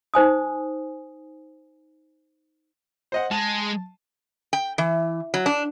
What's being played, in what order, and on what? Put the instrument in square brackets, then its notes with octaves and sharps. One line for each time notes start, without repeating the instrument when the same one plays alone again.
[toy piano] D#4 C5 G#5 D#6
[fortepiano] C5 D#5 F#5
[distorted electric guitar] G#3 [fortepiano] A5
[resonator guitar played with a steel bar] G5
E3
F#3
D4